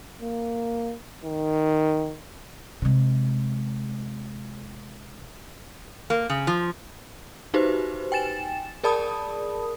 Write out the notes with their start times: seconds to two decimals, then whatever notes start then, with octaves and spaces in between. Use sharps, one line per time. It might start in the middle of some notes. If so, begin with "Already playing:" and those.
0.22 A#3
1.25 D#3
2.82 C3 G#3
6.10 A#3
6.30 C#3
6.47 F3
7.54 D#4 F#4 G4 B4 C5
8.12 G5 G#5 A6 E7
8.84 G#4 A#4 D5 A5 B5 D#6